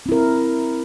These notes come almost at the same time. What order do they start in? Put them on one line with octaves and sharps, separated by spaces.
C4 E4 A#4